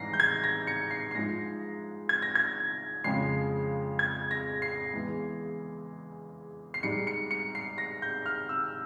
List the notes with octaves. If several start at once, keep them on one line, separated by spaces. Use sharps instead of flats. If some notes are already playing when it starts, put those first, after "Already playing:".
Already playing: G#2 E3 G3 A#6 C7
G6
G#6
A#6
C#7
C7
C7
G#2 F3 G#3 A#6
G#6
A#6
G#6
F2 C#3 F3 G#3 C7
G#6
A#6
C7
E2 E3 G#3
C7
G#2 G3 C#7
C#7
C#7
C7
A#6
G6
F6
E6